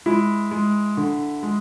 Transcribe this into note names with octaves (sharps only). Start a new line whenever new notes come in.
G#3 E4
G#3
D3
G#3